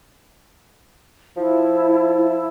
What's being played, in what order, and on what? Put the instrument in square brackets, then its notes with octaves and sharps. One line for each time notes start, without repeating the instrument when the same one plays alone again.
[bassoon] F3 [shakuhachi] E4
[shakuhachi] E4